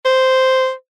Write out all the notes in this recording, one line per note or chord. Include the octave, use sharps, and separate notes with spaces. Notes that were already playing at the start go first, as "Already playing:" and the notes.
C5